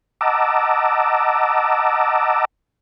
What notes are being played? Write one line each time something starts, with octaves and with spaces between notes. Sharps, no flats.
D#5 F#5 A5 A#5 D6 E6